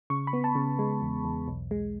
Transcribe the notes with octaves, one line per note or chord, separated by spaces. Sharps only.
C#3 C#6
B5
B3
A5
C#3
G#3
E2
E2
B1
G#3